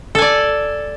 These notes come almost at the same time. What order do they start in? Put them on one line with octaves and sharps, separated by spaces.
A4 G#5 D5